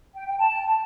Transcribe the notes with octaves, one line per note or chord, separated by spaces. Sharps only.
G5
G5
A5